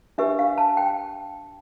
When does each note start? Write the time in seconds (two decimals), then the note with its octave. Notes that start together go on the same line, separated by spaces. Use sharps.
0.18 D4 G4 B4 E5
0.39 F5
0.58 A5
0.77 G5